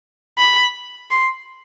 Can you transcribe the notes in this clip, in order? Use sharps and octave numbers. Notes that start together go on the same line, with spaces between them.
B5
C6